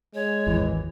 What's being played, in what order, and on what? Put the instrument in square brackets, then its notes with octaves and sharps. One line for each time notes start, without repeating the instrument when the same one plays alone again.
[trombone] G#3 [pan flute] C#5
[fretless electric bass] G#1 D#2 E3